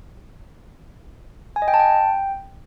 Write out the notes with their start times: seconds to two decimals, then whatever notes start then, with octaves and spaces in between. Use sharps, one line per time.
1.56 G#5
1.62 D#5
1.68 G5
1.74 A5
1.80 G5